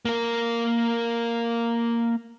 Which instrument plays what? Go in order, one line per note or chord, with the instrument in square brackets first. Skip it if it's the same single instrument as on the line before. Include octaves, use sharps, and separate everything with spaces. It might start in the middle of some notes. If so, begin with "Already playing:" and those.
[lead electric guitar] A#3 A#4